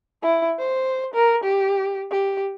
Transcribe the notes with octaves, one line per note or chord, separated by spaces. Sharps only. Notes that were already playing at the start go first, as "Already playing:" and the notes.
E4
C5
A#4
G4
G4